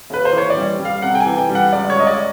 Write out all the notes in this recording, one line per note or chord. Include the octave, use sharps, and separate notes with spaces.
D#2 B4
C5
E3
C#5
D5
G3
G3
F5
C3 F#5
G5
G#5
E3
G5
G3
F#5
C#2 D5
C#5
C#2 D#5
D5